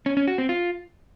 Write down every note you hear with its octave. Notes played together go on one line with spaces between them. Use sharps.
C#4
C#4
F#4
C4
F4